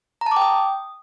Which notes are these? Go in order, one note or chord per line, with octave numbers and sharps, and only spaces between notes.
A#5
A5
D6
G5
D#6